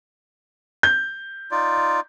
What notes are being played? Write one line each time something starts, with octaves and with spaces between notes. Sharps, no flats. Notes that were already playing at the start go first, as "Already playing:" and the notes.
G6
D#4 F4 D5